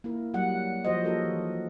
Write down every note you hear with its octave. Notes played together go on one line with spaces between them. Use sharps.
A#3 E4 A#4
F#3 G3 F#5
F3 F#4 C5 D#5
A#3 D#4 F#4 G4 A4 A#4
E3